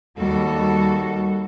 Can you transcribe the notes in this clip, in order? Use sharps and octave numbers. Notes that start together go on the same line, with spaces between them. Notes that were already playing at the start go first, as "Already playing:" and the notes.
D#2 G3 F#4 A4